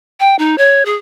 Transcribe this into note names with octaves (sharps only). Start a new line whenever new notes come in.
G5
D#4
C#5
G#4